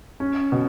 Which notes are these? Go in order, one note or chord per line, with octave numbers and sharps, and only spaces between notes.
C#4
B2